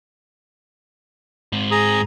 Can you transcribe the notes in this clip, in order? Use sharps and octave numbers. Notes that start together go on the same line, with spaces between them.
G#2 C4
G#4 A#5 D#6